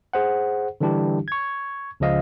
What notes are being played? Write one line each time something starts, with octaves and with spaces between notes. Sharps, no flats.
G#4 C5 F#5
D3 E3 G3 D4 E4 G4
C#6 G#6
C#2 C#3 F3 D#5 F5